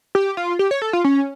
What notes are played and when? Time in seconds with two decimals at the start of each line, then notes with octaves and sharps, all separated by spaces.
0.15 G4
0.37 F4
0.59 G4
0.71 C#5
0.82 A4
0.93 F4
1.04 C#4